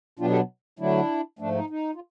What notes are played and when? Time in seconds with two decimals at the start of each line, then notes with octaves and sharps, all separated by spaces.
0.19 B2 F#3 B3 D4 F4 G4
0.30 G4 A4
0.79 D3 F#3 A3 D4 E4
1.39 G#2 F3 A3 D4
1.55 D#4
1.70 D#4
1.95 F4